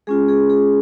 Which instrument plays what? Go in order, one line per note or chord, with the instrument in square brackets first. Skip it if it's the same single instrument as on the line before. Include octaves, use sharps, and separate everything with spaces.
[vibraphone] G#3 C#4 F4 G#4
G#4
G#4